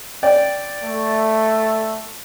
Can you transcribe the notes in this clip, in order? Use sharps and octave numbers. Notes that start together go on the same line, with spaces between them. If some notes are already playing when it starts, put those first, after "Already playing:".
D5 G5
A3